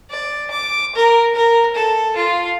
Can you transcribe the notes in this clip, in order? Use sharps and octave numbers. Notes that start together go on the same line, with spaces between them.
D5
D6
A#4
A#4
A4
F4